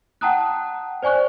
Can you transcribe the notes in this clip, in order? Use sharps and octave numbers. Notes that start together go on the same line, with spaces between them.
F#5 G5 A5 A#5 D#6 F#6
C5 D5 G#5 C#6 F#6